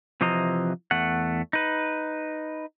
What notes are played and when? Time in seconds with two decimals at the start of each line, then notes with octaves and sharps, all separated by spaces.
0.21 C3 E3 F3 C5 D#5 A#5
0.91 E2 A3 F#5
1.53 D#4 B4